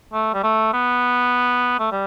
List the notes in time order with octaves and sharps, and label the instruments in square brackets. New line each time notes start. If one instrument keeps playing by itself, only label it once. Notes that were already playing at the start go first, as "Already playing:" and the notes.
[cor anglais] A3
G3
A3
B3
A3
G3